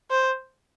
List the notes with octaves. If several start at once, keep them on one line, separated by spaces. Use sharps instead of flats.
C5